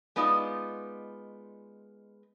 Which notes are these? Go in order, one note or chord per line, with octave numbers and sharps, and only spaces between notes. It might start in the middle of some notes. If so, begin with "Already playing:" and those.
G#3 B3 D#4 F4 D5